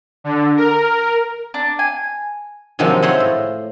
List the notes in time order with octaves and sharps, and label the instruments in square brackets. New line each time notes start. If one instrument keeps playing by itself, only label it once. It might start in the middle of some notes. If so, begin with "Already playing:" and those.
[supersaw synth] D3
A#4
[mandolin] D4
G#5
[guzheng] C3 D#3 F3 F#3 G#3 D#4
F4 C5 C#5 D#5 E5 F#5
A2